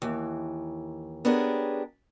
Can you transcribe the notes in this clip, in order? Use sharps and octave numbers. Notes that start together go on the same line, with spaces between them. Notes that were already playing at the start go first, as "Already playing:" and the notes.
D#2 E3
B3 C#4 D4 G4 G#4 A#4